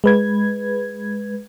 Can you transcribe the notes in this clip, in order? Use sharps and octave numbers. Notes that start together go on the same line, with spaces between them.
G#3 B4 G#6